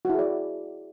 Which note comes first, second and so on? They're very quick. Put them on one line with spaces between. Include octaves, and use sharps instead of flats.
F#4 E4 G#4 D5